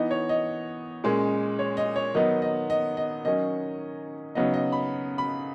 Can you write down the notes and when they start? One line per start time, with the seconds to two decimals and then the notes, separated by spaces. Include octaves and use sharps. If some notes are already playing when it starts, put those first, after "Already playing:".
Already playing: E3 B3 D#4 D#5
0.11 C#5
0.29 D#5
1.04 A#2 G#3 C#4
1.59 C#5
1.77 D#5
1.96 C#5
2.14 D#3 F#3 B3 D#4 D#5
2.42 D#5
2.70 D#5
2.97 D#5
3.25 D#3 F#3 C#4 D#5
4.35 C#3 F#3 B3 D#4 D#5
4.54 D#5
4.72 B5
5.18 B5